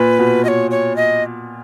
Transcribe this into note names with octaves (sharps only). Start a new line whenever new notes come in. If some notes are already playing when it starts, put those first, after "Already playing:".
Already playing: A#2 B4
B2
D#5
C#5
C#5
D#5